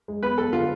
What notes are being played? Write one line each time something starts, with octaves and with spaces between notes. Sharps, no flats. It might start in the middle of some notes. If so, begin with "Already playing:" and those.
G#3
B3 B4
B3 A4
D3 F4